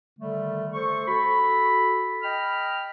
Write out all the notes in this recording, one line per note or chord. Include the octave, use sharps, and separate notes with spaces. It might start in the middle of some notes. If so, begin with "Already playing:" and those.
D3 D#3 G3 A3
A4 C5 C#6
F#4 A4 B5
D#5 G5 B5 F6